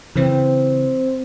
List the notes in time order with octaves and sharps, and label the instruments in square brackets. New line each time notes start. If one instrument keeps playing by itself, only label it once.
[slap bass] C#3 E3 [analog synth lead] C4